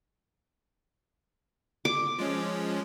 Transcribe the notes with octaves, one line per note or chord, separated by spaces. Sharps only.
D6
F3 G#3 C#4